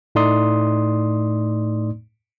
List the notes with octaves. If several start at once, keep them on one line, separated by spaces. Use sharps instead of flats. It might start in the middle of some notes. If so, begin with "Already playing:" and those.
A2 A3 D#4 D5 C6 D#6